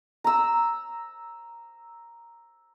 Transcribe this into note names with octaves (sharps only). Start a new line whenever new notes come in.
A#5 E6